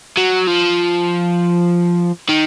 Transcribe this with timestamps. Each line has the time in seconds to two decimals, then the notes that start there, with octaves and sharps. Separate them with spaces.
0.17 F#3
0.47 F3
2.29 D#3